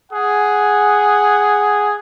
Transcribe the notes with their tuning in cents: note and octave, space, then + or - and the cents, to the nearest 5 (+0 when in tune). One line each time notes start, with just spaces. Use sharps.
G#4 +0 F#5 +0